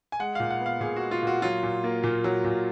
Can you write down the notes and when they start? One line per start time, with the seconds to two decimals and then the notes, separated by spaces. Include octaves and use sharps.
0.12 G#5
0.20 G#3 F#5
0.35 A#2 F5
0.51 F#5
0.61 B3
0.66 F5
0.81 A#2 G#4
0.96 F#4
1.02 G#3
1.11 F4
1.23 A#2 F#4
1.42 F#3 F4
1.63 A#2
1.84 A#3
2.03 A#2
2.24 F#3
2.44 A#2